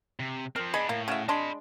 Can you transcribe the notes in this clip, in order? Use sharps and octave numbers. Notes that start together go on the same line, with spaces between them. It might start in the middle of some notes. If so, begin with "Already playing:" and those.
C3
F3 C4 A#4
B3 D4 G#4 D#5 B5
A2 A#3
C#3 F#4 E5
G#3 D4 D#5 B5 C6